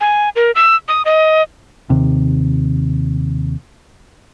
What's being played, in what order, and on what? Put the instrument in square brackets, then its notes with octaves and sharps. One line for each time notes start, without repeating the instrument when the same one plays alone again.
[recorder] G#5
A#4
E6
D#6
D#5
[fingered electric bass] D#2 C3